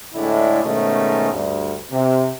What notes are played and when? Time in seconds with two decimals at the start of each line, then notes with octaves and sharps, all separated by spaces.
0.14 A2 D3 G#3 D4 E4
0.64 G#2 B2 D#3 A3 C#4 D#4
1.32 D2 G2
1.91 C3